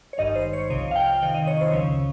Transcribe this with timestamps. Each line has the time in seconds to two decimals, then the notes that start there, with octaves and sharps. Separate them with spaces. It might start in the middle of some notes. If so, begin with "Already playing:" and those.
0.13 C#5
0.18 G#1 G2 D#3 D#5
0.36 C5
0.53 C#5
0.70 C2 C3 F3 D#5
0.91 F5
0.96 G5
1.22 F2 C3 D#3 G5
1.34 D#5
1.47 C#5
1.61 C5
1.73 C#2 C#3 F3